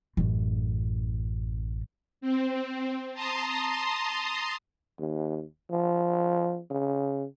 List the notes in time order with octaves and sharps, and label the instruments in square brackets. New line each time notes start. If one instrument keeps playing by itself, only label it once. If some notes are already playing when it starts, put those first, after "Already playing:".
[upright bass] A1 F#2
[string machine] C4
A5 A#5 C6 D#6
[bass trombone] D#2
F3
C#3